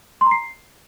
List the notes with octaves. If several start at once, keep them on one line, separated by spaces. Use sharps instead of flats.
C6
A#5
C7